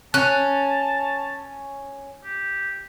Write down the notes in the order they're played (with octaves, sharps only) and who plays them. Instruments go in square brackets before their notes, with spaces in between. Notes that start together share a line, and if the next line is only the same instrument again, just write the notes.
[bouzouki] C#4 [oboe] A5 [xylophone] F#6
[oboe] G4